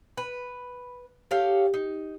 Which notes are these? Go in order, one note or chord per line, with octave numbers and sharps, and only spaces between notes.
B4
G4 A4 C#5 F5
D#4